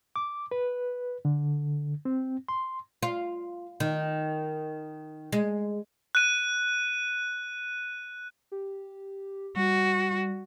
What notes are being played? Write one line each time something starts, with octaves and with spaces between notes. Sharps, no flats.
D6
B4
D3
C4
C6
F4
D#3
G#3
F#6 D#7
G4
G3 F#4